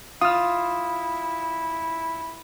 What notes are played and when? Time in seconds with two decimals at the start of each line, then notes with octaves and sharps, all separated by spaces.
0.21 E4 F4 D#6 F6